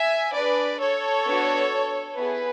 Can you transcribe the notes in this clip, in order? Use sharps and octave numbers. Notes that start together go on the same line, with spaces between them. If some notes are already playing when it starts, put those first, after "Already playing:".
Already playing: E5 G#5
D4 G#4 B4 D5
A4 C#5
B3 D4 F#4
B3 E4 G#4 B4